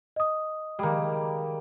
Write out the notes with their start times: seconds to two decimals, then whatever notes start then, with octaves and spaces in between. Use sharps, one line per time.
0.16 D#5 D#6
0.79 D#3 G3 G#3 A#3